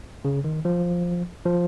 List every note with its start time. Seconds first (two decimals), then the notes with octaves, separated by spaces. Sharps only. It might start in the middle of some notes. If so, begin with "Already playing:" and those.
0.25 C#3
0.44 D#3
0.65 F3
1.46 F3